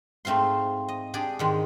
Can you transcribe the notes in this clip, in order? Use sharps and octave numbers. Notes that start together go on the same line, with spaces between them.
G#2 A3 C4 F4 C6
D#5
D4 G4 G#4 D5
G#2 D#3 G#3